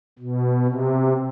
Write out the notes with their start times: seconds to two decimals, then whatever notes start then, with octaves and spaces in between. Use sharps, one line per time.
0.19 B2
0.65 C3